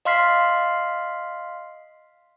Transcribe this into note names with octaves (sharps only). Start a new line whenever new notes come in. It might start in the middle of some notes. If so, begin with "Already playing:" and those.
D#5 F5 C6 F6 B6 C7